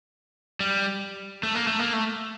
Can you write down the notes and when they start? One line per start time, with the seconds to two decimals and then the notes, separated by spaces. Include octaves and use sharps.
0.60 G3
1.43 A3
1.55 A#3
1.67 A3
1.79 A#3
1.93 A3